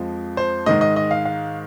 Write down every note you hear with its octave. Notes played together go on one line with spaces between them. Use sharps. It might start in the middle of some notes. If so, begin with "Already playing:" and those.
Already playing: F2 F3 G#3
C5
G#2 D#3 G#3 D#5
D#5
D#5
F5
F5